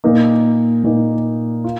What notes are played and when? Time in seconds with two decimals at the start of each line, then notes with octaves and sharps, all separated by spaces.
0.04 A#2 A#3 D#4
0.84 A#2 A#3 D#4
1.64 F4